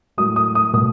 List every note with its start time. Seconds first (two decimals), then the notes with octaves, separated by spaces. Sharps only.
0.17 A2 F#3 A3 D#6
0.36 D#6
0.55 D#6
0.73 B2 F#3 A3 D#6